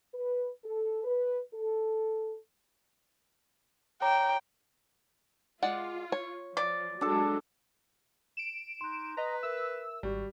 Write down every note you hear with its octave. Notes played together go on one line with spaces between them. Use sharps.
B4
A4
B4
A4
C#5 G5 A#5 D6
G#3 F4 D5 F#5
C#5
F3 D5
F#3 G#3 D4 A4
D7 E7
D#4 C6 F#6
B4 D#5 A#5
A#4 E5 E6
G#1 G3 F#4